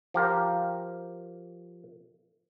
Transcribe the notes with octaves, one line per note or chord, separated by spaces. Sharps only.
F3 G4 A#4